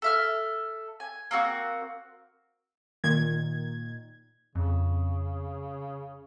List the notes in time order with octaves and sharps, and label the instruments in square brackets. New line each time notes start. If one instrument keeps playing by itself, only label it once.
[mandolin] A4 E5 F6
G#5
A#3 C4 F#4
[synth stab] A#2 D#3 G#6
[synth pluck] F2 [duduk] C#3